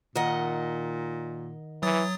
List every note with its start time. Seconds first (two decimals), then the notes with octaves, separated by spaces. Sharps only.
0.15 A#2 D#3 D#5 F#5
1.83 E3 F#3 D#6 A6